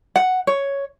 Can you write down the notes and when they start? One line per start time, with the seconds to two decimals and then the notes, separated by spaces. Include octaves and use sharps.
0.16 F#5
0.47 C#5